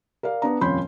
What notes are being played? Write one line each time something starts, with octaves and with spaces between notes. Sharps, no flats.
A#4 D5 F5
B3 D4 A#5
D#1 F2 C#4 B5 C6 G6